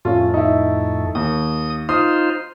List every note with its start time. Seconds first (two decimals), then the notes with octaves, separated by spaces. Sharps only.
0.05 F2 A2 A3 C#4 F4
0.34 D#4 E4
1.15 D#2 D#6
1.89 D#4 F4 C5 D#6 F6